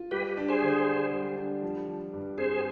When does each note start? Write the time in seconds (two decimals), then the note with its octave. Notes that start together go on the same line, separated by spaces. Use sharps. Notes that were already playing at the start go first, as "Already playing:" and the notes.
Already playing: F4
0.11 G3 G4 B4
0.37 D4
0.49 G#4 C5
0.62 D3
0.87 D4
1.12 G3
1.37 D4
1.63 F3
1.88 F3
2.13 G2
2.38 C4 G#4 C5